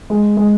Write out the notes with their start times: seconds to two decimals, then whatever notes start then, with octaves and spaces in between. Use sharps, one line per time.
0.10 G#3
0.37 G#3